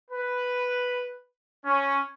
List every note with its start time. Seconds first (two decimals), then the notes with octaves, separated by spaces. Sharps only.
0.11 B4
1.65 C#4